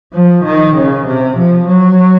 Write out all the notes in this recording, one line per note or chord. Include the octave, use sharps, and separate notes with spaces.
F3
D#3
C#3
C3
F3
F#3